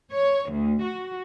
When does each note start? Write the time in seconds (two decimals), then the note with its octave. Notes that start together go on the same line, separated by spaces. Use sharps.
0.11 C#5
0.51 D2
0.82 F#4